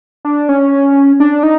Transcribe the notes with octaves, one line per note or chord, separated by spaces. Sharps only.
D4
C#4
D4
D#4